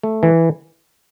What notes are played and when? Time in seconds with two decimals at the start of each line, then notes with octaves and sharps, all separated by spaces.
0.03 A3
0.23 E3